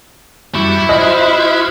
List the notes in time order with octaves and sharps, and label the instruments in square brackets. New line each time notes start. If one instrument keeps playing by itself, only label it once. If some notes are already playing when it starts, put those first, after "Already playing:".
[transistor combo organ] F#2 G3 C#6 [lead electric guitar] E4
[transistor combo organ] F4 F#4 [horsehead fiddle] C5 E5 [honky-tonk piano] D#5